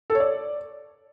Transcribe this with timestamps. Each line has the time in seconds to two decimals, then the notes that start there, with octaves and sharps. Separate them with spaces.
0.10 A4
0.15 C#5
0.20 D5